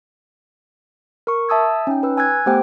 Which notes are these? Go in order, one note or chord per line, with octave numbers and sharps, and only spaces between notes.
A#4 C#6
E5 A5 D#6 E6 G#6
C#4 D#4 G5
B4 E6
G#5 E6 F#6 G#6
A3 B3 G4 C5 G5